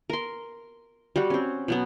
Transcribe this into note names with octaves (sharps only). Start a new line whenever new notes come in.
A#4 C6
G3 F#4
C4 C#4
B2 F#3 B3